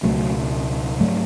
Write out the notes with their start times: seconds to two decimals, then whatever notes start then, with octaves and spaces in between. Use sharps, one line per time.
0.03 C#2 B2 F#3 A3
1.00 G#2 F#3 A3